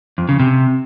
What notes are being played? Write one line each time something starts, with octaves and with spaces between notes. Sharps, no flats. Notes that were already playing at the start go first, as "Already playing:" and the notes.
F2
C#3
C3